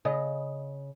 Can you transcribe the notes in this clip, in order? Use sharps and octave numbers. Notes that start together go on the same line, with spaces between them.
C#3 D#5